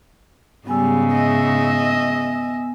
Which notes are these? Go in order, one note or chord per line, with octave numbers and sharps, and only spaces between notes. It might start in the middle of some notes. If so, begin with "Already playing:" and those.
G#2 C#3 G3 B3 G#5 E6
D#5 E5